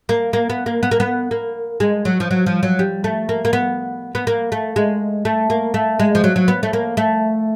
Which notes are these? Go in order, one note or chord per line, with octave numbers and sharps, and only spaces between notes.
A#3
A#3
B3
A#3
B3
A#3
B3
A#3
G#3
F#3
F3
F#3
F3
F#3
G3
A3
A#3
A#3
B3
B3
A#3
A3
G#3
A3
A#3
A3
G#3
F3
F#3
F#3
B3
A3
A#3
A3